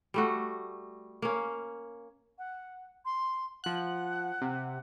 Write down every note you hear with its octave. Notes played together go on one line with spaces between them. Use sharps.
G3 A3 F#4
A#3 C#4
F#5
C6
F3 F#5 F#6
C3